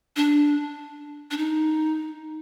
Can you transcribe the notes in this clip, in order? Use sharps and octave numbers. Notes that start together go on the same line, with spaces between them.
D4
D4
D#4